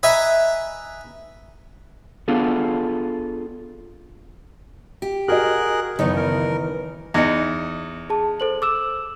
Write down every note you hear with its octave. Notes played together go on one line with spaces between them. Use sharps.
B4 D#5 E5 G#5 A#5
B3 D4 F4 G#4 A4
G4
F#4 G#4 A#4 D#5 F#6
F#1 D#3 E3 F#3 B3 D#4
A#4
E2 D#4 A#6 C#7
G#4 A5
A4 C5 F#7
D6 E6 E7